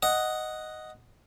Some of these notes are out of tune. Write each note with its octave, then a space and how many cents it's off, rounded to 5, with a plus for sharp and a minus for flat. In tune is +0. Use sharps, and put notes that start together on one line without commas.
D#5 +0 F#5 +0